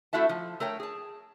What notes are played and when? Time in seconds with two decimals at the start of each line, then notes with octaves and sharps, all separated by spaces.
0.13 A3 E4 F#4 E5 A5
0.29 F3
0.60 A3 A#4 C#5 G5
0.80 G#4 A5